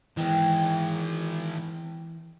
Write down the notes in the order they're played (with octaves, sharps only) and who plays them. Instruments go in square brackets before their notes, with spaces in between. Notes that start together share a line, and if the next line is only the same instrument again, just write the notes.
[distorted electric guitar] D#3 G#3 [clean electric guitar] E3 [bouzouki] B3 C4